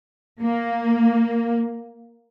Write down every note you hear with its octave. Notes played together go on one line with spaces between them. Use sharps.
A#3